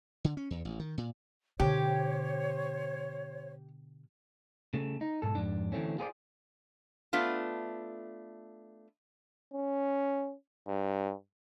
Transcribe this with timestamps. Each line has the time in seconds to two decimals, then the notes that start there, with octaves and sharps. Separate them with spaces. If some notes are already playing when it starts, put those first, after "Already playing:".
0.24 D3
0.37 C#4
0.51 E2
0.65 A1
0.79 D#3
0.98 A#2
1.60 B2 D3 G4 C5 C#5
4.74 C#3 A3
5.01 D#4
5.22 B1 G#2 A4
5.35 F2 G#2 D4
5.72 D3 E3 F#3 A3 C4 C#4
5.98 F4 F#4 G#4 B4 C5 D5
7.13 A3 B3 D4 F4
9.53 C#4
10.68 G2